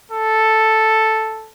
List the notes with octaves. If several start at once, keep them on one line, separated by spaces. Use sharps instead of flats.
A4